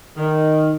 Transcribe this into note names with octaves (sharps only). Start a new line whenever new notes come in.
D#3